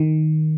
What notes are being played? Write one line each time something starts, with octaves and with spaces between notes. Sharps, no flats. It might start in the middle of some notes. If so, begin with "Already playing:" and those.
Already playing: D#3